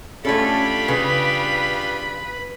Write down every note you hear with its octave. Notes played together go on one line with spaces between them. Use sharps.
A3 C#4 D4 F4 G4 A4 B5
C#3 B4